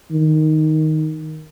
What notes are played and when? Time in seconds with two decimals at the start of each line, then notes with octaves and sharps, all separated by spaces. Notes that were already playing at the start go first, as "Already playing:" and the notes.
0.11 D#3